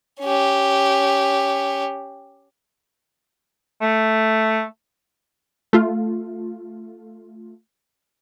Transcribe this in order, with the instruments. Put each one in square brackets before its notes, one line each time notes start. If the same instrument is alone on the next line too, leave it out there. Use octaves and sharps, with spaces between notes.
[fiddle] C#4 G4
[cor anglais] A3
[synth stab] A3 F4